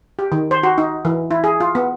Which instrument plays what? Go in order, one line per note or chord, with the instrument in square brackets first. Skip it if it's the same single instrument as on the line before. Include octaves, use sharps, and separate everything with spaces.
[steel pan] G4
D#3
C5
F#4
D#4
E3
E4
G#4
F4
B3